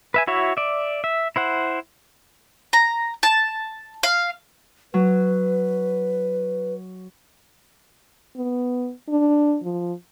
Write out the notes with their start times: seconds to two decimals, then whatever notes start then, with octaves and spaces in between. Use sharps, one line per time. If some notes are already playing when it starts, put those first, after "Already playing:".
0.14 B4 E5 G#5
0.27 E4 F#4 C#5 E5
0.57 D5 E5
1.04 E5
1.36 E4 C5 F#5
2.73 A#5
3.23 A5
4.03 F5
4.94 F#3 B4
8.36 B3
9.09 D4
9.63 F3